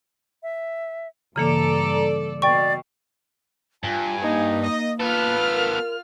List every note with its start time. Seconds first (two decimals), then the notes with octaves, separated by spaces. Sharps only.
0.43 E5
1.36 G2 C#3 E3 A#3 A4 D5 A#5
2.42 B2 D5 G5 C#6
3.84 G2 F4 G#5
4.22 A#3 D#4
4.62 D#5
5.00 B3 F4 A4 B4 F6
5.52 A#4